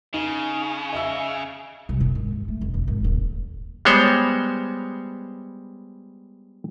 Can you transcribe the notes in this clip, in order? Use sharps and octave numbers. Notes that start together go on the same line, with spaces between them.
C#3 D#4
D#5 E5 E6
C2
A#2
G#1
D#2
A3
F1
E1
G#1
D#1
G3 G#3 B3 C5 C#5